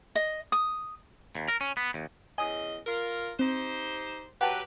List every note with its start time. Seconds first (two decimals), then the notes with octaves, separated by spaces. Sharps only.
0.15 D#5
0.52 D#6
1.35 D#2
1.48 A#4
1.61 C#4
1.77 B3
1.94 D#2
2.38 E2 C#3 D#5 G#5 D#6
2.86 F4 A#4
3.39 C4 D#4 G4 C5
4.41 F#3 G4 B4 F#5 G5 A5